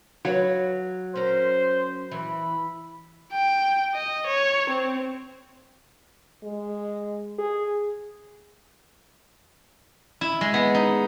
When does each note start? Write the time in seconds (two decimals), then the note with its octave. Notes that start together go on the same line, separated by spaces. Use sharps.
0.25 F#3 B4 C#5 F5
1.16 C#4 A#4 C5
2.11 E3 B5
3.32 G5
3.94 D#5
4.27 C#5
4.70 C4
6.43 G#3
7.38 G#4
10.21 E4
10.41 G#3
10.54 B3
10.75 D#4